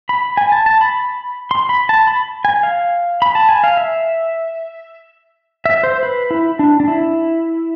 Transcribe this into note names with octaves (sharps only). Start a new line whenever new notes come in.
B5
G#5
A5
A5
B5
C6
B5
A5
B5
G#5
F5
B5
A5
G#5
F5
E5
E5
C5
B4
E4
D4
D4
E4